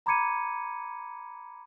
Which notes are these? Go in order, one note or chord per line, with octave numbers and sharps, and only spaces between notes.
A#5 B5 D6 G#6 C#7 D#7